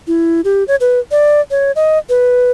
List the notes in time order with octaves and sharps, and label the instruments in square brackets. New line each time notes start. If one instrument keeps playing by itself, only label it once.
[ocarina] E4
G4
C#5
B4
D5
C#5
D#5
B4